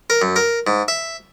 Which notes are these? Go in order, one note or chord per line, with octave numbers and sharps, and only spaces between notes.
A#4
F#2
A#4
G#2
E5